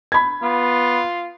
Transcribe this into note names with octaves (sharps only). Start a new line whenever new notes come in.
B5 G#6
B3 F4